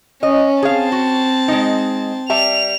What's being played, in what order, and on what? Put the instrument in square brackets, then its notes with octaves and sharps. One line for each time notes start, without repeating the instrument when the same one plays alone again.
[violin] C#4 [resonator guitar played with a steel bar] D#5
[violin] C4 A5 [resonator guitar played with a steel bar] G#4 F5
[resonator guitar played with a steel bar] F#4
G#3 D#4
[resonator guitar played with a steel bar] G3 E5 A5 [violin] F7